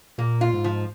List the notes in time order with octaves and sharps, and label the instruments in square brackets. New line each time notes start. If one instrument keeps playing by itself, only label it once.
[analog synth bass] A#2 [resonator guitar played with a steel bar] A#3
[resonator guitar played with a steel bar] F4
[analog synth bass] G#2
[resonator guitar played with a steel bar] F3